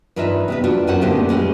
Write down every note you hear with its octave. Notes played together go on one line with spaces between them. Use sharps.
G2 E3 D#4 F4 B4 E5
C3 B3 B4
D4 F4 F#4 B4 D5
F#2 C#4 F4 C5 F#5
A#2 D3 A3 B3 E4 G4
E2 G#3 C#4 E4 G4